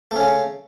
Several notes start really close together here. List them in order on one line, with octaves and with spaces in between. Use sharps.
A3 C#4 C#3